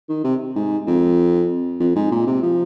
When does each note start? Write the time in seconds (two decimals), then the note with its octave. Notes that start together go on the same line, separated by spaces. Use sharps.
0.09 D#3
0.24 C3
0.56 G#2
0.87 F2
1.80 F2
1.95 G#2
2.11 A#2
2.27 C3
2.42 F3